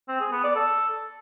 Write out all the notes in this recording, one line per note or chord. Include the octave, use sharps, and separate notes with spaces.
C4
G#4
B3
D5
A4